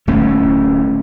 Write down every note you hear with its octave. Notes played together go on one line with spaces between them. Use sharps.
D1 A3 C#4